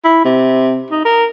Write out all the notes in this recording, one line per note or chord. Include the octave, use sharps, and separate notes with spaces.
E4
C3
D#4
A#4